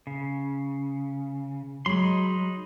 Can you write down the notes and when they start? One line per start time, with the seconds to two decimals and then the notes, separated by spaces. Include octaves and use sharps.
0.07 C#3
1.86 F#3 G#3 D#4 B5 C6